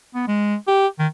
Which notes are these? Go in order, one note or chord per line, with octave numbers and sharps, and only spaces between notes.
B3
G#3
G4
D#3